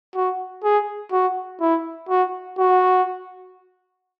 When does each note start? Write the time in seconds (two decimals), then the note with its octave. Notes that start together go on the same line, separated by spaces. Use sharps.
0.15 F#4
0.64 G#4
1.12 F#4
1.60 E4
2.09 F#4
2.58 F#4